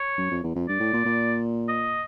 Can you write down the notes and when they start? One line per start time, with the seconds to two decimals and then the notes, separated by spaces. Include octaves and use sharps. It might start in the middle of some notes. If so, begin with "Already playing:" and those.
Already playing: C#5
0.18 F#2
0.31 F2
0.44 E2
0.55 F2
0.68 G2 D5
0.80 A2
0.93 A#2
1.06 A#2
1.69 D#5